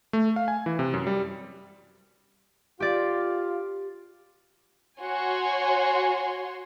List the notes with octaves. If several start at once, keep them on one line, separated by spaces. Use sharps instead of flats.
A3
F5
G#5
E3
C3
F#2
G3
F4 G4 D5
F#4 C#5 G#5 C6